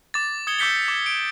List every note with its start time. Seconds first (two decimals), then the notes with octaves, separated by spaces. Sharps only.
0.14 D6 A6
0.47 D#6 G#6 C#7 G7
0.59 D6 E6 G6 B6 C#7 G7
0.88 D6
1.06 D7